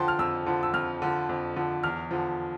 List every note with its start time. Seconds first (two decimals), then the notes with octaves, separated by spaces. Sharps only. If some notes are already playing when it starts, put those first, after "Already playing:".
Already playing: D3 F3 G5 A5 C6
0.08 F6
0.19 F2 E6
0.46 D3 F3
0.63 E6
0.74 F2 F6
1.02 D3 F3
1.29 F2
1.56 D3 F3
1.83 E2 F6
2.11 D3 F3